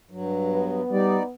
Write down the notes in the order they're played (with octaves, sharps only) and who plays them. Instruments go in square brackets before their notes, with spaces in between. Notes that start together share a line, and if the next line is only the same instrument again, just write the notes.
[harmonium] G2 F#3
[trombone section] B3
[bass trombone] G3 [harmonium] D#4 D5